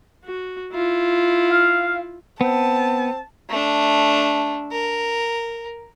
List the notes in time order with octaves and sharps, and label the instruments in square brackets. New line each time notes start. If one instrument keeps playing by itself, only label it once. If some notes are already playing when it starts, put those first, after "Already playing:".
[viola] F#4
E4 F4
[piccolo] F5
[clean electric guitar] B3 [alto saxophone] C4 [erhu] A5
[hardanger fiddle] A3 D4
A#4